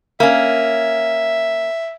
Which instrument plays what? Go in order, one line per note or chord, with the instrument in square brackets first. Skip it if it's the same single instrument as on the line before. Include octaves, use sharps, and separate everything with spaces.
[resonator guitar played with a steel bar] A#3 C#4 [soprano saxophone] E5